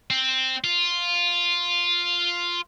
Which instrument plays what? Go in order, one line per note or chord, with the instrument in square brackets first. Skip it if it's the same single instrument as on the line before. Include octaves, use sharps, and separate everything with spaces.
[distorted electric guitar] C4
F4